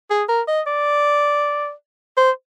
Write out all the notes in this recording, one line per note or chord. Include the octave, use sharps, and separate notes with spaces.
G#4
A#4
D#5
D5
C5